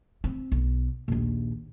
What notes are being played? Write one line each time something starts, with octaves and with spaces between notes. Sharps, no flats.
C4
B1
A#1 D#2